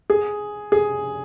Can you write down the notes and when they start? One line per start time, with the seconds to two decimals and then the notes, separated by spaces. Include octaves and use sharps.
0.10 G#4
0.72 G#4